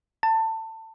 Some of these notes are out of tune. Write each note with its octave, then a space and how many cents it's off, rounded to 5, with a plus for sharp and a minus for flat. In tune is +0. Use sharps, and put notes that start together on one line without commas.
A5 +25